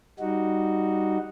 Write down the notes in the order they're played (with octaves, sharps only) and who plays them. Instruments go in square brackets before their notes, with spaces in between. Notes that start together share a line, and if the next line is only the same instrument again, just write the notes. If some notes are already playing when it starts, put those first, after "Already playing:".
[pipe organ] G3 D#4 F#4